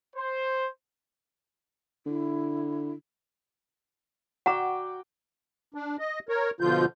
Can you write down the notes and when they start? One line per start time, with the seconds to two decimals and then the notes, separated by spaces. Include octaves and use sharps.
0.16 C5
2.06 D3 E4
4.46 F#4 D5 F#5 G5 A#5
5.74 D4
5.99 D#5
6.29 A#4 C#5
6.61 B2 D3 F3 F4 G6